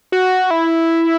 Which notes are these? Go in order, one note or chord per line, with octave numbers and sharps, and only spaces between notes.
F#4
E4